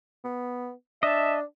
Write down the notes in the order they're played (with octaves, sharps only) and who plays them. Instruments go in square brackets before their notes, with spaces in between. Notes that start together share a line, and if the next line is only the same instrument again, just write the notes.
[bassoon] B3
[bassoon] D4 [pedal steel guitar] D#5 A5 [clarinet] E5